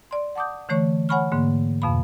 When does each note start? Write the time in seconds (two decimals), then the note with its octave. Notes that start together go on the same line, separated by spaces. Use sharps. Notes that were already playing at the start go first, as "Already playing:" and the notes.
0.11 D5 C6
0.35 F#5 A5 D6 D#6 G6
0.69 D3 E3 A3 C#5 C#6
1.09 C#5 F#5 G#5 B5 C#6 F6
1.32 G#2 D3 A#3
1.82 F2 B2 F5 B5